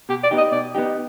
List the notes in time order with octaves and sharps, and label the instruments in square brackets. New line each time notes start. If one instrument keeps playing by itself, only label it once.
[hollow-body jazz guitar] B2 [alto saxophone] G4
[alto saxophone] D5
[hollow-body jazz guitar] B3 D#4 G4
[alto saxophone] D#5
[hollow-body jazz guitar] B2 [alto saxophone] D5
[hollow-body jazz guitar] B3 D#4 G4